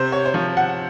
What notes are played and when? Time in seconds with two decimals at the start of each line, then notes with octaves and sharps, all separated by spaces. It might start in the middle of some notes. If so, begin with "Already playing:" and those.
Already playing: C3 C5
0.12 C#5
0.26 C5
0.34 F3 C#5
0.57 F#5